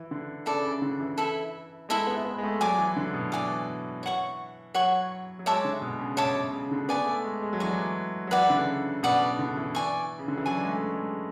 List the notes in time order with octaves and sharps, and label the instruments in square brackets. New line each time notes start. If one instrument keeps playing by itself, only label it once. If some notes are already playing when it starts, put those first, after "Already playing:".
Already playing: [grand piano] E3
D3
[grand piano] C#3 [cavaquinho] E4 A4 D5
[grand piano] C#3
D3
E3
[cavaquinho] E4 A4 E5
[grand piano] G#3 [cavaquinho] E4 A4 E5
[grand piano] B3
B3
G#3
A3
[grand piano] F#3 [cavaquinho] D5 G#5 D6
[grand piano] E3
D3
B2
[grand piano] E3 [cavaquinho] D5 G#5 D6
[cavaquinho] C#5 F#5 C#6
[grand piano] F#3 [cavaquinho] C#5 F#5 C#6
[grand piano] F#3
[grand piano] G#3 [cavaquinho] C#5 E5 A5 D6
[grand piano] D3
B2
C#3
[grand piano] B2 [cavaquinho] C#5 E5 A5 D6
[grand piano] B2
C#3
D3
[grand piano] B3 [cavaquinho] D5 G#5 C#6
[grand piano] A3
G#3
G#3
F#3
[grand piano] E3 [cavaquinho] D5 G#5 C#6
[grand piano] F#3
F#3
[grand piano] E3 [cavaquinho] B4 D5 F#5
[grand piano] D3
C#3
[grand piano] B2 [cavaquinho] B4 D5 F#5
[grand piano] D3
E3
[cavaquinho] D5 G#5 C#6
[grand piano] C#3
D3
E3
[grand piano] F#3 [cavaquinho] D5 G#5 C#6
[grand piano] G#3
A3
G#3